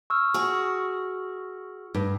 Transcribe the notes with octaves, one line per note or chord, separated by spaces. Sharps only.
C#6 E6 F6
F#4 G#4
G2